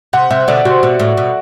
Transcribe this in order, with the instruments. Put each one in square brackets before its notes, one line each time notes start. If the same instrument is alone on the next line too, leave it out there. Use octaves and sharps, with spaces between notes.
[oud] C3 [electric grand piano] F#5
[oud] C3 [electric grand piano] E5
[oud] B2 D3 [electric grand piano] D5
[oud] C3 [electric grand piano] F#4
[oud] B2
A2
B2